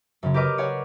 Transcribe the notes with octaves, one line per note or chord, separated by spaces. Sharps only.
F#2 C#3 C#4
G4 A#4 B4 D#5 D6 F6
C#5 D5 F#5 G#5